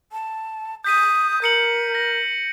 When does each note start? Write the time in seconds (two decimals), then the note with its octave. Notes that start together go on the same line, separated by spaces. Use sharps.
0.12 A5
0.84 D#6 G6 B6 D#7
1.42 A#4 G6 C#7 F#7
1.95 A#6